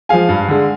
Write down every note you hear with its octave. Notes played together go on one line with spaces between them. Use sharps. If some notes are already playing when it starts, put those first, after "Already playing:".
F3 G#3 F5 G#5
G2
D3 G#3